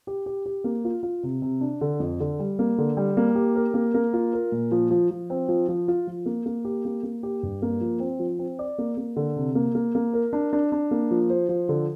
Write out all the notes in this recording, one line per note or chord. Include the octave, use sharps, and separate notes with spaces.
G4
G4
G4
A#3
F4
F4
C3
C3
D4
D3
F2
D3
G3
A#3
D3
G3
A#3
G4
A#4
A#3
A#3
F4
A#4
A#2
F3
F3
F3
C4
F3
F3
F4
F3
A#3
A#3
G4
A#3
A#3
G4
G2
A#3
F3
C4
F3
C4
D5
A#3
A#3
D3
C3
A#3
A#3
A#3
A#4
D4
D4
D4
A#3
F3
C5
F3
D3